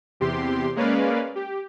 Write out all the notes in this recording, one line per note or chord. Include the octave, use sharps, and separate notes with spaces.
E2 C3 G4 C6
G#3 A#3 C#4 B4 D5 F5
G4